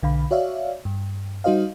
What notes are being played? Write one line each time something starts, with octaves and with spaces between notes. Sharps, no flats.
B1 D3 F5 B5
F#4 C#5 D5 E5 F5
G2
G3 D#4 F#4 C5 D#5 F5